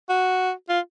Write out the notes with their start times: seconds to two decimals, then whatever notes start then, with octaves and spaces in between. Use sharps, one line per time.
0.09 F#4
0.69 F4